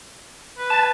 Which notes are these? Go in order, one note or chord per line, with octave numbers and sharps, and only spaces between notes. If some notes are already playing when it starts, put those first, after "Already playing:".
B4
A5